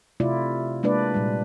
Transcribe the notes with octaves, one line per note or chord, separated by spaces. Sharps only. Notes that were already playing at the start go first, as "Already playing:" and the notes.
C3 A3 E4 F4 D5
G#3 A#3 D4 B4 D5
A#2 G3